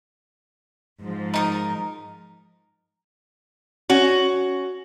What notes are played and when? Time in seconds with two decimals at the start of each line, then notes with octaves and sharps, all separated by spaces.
1.01 G#2 F3
1.34 D#4 A#4 D#6
3.89 C#4 F#4